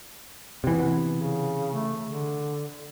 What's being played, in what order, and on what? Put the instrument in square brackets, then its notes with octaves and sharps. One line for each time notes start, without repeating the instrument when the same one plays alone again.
[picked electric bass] C3 E3 [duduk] B3
[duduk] C#3
A3
D3